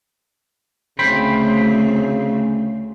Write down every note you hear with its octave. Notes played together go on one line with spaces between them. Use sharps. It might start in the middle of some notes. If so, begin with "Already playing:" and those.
D2 C#3 A3 C4 C5 G5 B5